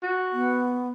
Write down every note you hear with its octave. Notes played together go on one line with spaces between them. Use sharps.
F#4
B3